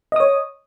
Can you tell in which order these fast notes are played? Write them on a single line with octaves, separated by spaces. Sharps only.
D#5 D#6 C#5